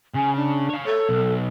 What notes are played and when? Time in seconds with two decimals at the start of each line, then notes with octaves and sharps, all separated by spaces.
0.15 C#3 G#5
0.36 D4
0.69 C#5 F5
0.85 A4 C#5
1.09 B1